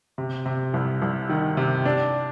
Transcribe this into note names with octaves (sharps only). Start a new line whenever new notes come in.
C3
C3
C2
C2
D#3
C3
D4